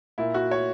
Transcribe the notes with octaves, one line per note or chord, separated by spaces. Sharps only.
A#2 E4
F#4
C#5